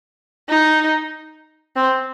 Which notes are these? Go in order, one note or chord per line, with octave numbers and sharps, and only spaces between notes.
D#4
C4